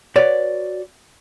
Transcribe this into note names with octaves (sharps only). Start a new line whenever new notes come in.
F#4 B4 C#5 D5